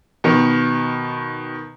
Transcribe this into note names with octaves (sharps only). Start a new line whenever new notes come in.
B2 D#3